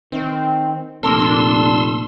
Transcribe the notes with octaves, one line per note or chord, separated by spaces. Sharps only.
D#3 C4
F1 A#2 A4 A#4 C6 E6
D4